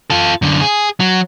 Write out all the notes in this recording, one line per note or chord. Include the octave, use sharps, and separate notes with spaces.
F4 A4
F#2 D3
G#4
F#3